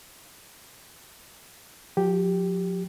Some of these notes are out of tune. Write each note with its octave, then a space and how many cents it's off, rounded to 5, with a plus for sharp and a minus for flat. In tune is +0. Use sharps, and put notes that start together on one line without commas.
F3 +45 G4 +0